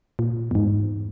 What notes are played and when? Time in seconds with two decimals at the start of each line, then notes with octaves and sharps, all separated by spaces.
0.19 A#2
0.51 E2 G#2